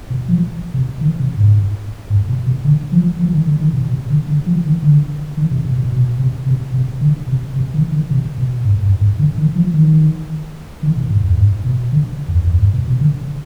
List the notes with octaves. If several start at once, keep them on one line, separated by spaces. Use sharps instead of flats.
B2
F3
C3
D#3
C3
G#2
G#2
B2
C3
D3
F3
F3
D#3
D3
D#3
B2
C3
D3
D3
F3
D#3
D3
D#3
C3
B2
B2
B2
C3
C3
C3
D3
C3
C3
D#3
D#3
C3
B2
G#2
G2
G#2
D3
D#3
F3
D#3
D#3
B2
G#2
F2
G#2
B2
D3
F2
F2
G2
B2
C3
D3